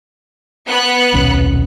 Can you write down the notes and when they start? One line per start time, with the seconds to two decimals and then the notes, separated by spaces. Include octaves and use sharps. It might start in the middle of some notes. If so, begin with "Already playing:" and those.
0.68 B3 F#6 C#7
1.13 D#1 B1 C#4